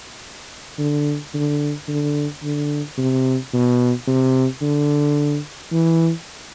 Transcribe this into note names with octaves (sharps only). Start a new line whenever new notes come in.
D3
D3
D3
D3
C3
B2
C3
D3
E3